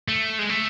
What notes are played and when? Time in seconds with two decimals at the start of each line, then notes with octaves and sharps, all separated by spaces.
0.08 A3
0.39 G#3
0.49 A3